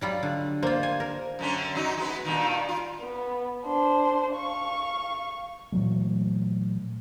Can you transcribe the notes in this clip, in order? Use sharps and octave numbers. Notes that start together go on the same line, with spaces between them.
F#3 G3 F4
D3
A#3 F4 C5
G#5
A#4
F#2 D3 C#4
F#2 F#3 D#4
G#3 B3
G2 A#2 D#3
F4
B3
D4 C5
F5 C#6
A#2 E3 F#3 A3